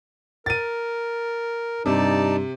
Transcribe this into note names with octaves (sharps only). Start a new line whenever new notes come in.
A#4 A6 D#7
G2 C3 D#4 D5 A5